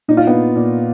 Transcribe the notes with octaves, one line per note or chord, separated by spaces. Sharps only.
A#2 D#4
F4
B3 D#4
A#2
A#2